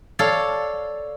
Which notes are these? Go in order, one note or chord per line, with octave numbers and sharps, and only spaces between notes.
A4 C#5 D5 F5